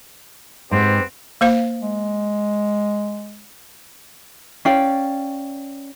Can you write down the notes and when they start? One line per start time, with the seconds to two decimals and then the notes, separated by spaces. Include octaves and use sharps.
0.71 G#2 B3 C4 G4
1.41 A#3 C5 F5
1.82 G#3
4.65 C#4 D5 F5 G5